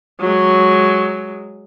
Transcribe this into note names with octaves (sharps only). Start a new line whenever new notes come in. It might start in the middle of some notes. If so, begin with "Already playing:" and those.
F#3 G#3